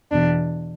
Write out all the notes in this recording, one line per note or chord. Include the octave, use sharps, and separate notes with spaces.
E2 B2 D4